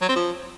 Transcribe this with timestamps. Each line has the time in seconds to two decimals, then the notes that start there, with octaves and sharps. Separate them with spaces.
0.01 F#3
0.09 C4
0.16 F3